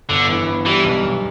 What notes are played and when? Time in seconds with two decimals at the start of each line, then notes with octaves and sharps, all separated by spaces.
0.09 G1 D3
0.29 E3
0.47 B3
0.65 E3 G3
0.84 B1
1.03 B1